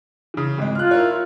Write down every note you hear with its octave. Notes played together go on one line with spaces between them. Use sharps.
C#3 E3
G#1 G#3
F4 F6 F#6
E4 A#4 C#5